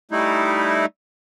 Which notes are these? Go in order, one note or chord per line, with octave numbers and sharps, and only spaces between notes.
G3 A3 D#4 E4